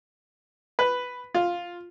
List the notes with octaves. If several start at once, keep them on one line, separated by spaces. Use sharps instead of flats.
B4
F4